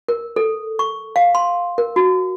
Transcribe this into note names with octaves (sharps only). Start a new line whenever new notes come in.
A#4
A4
C#6
F5
C6
A#4
F#4